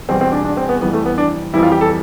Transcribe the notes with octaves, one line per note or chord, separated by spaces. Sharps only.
E2 B2 G3 C4
C4
D4
D4
C4
B3
F2 E3 G3 B3
A3
B3
D4
F2 E3 G3 E4
F4
G4
A4